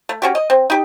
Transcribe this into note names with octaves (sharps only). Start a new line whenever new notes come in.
A3
C#4 F#4 G4
D#5
C4
D#4 G4